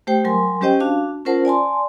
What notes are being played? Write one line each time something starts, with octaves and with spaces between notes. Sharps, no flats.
A3 G4 C5 G5
F#3 G3 A#4 G#5 C6
G3 C#4 G4 C5 D#5 G5
D4 F#4 F5 A5
C#4 F4 A#4 C5 F#5 A5
D5 G#5 A5 C6